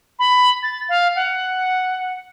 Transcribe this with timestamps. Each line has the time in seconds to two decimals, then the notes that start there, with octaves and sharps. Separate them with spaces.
0.19 B5
0.63 A6
0.89 F5
1.16 F#5